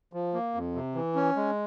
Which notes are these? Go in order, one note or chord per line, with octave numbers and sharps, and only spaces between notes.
F3
A#3
F2
C3
E3
C#4
G#3